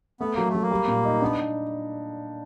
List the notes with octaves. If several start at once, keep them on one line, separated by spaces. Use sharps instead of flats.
A3 B3
F#3 A#3
A3
F#3
A#3
G3
A#2
D#4
B3 D4